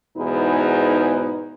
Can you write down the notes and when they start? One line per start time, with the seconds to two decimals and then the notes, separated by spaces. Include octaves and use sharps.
0.17 E2 G#2 B2 D#4 B4